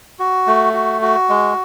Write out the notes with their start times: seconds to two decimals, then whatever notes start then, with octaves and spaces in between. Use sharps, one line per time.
0.19 F#4
0.47 A3
0.74 F#4
1.02 F#4
1.29 G#3